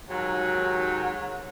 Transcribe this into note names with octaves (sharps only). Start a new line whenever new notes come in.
D#2 G#2 F#3